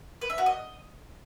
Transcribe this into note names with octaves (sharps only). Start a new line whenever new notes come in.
B4
E5
F#4
D#5